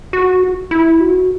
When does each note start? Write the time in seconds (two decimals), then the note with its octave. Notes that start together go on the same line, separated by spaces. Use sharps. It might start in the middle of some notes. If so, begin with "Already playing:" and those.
0.13 F#4
0.71 E4
1.00 F#4